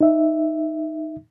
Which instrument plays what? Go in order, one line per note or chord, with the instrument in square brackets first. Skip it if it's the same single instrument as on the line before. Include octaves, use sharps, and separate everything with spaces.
[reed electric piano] D#4 E5